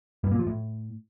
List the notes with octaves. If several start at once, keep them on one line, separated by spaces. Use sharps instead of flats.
G2
A#2
F3
A2